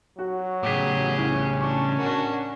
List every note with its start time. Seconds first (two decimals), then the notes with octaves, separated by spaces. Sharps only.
0.19 F#3 F#4
0.63 A2 C#3 G4 G#4 D6 B6
1.18 C2 C#4
1.61 D4 C#6 D6
1.98 D4 F#4 A#4